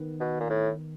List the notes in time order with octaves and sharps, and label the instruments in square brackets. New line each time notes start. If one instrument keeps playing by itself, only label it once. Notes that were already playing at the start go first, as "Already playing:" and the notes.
Already playing: [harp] D#3 B3
[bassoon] B2
A#2
A2